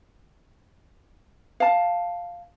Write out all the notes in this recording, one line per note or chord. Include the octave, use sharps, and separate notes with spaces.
F5 A5